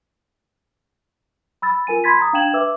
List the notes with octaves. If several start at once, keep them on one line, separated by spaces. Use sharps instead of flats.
B5 E6 A6
F4 A#4 G#5 D#7
B5 C6 G#6 A6 B6
A#5 D#6
D4 F5 G5 G#6 E7 F#7
B4 E5 D6 E6